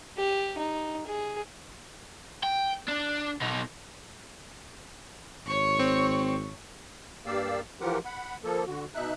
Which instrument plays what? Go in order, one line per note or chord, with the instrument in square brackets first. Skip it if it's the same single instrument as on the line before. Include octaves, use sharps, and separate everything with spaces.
[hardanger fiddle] G4
D#4
G#4
[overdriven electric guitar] G5
D4
B2 D#4
[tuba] G#1 [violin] C#5 C#6
[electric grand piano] C4
[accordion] G2 A#3 G4 D5 F5 E6
E3 F3 F4 G4 A#4 F#5
F#5 B5
F3 A#3 A4
D3 F#4
B2 D#4 E5 F#6